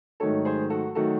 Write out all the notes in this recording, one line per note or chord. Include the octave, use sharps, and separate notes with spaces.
G#2 D#3 F#3 A3 A4 C#5
G#4 C5
F#4 A4
D#3 F#3 A3 F#4 A4